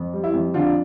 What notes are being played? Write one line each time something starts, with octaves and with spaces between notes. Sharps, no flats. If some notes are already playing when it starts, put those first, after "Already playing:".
Already playing: F2
G3
E4
F2
D3 D4 F4